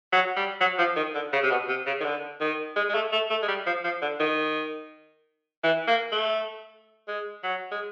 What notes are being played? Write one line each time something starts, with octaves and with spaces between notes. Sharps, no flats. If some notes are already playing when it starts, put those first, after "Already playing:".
F#3
G3
F#3
F3
D#3
D3
C#3
C3
B2
C3
C#3
D#3
D3
D#3
G#3
G#3
A3
A3
A3
G#3
G3
F3
F3
D3
D#3
E3
A#3
A3
G#3
F#3
G#3